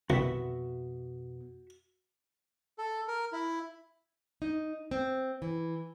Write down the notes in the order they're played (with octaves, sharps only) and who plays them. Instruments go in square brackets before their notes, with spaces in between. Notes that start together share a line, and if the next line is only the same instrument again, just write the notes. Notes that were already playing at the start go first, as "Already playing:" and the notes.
[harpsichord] C2 [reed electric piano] F2 B2 B3 [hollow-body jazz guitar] F#4 E5
[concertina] A4
A#4
E4
[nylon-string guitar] D#4
C4
E3